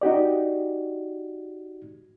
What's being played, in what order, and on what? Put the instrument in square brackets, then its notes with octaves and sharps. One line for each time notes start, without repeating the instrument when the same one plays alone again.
[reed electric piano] D#4 F#4 G4 D5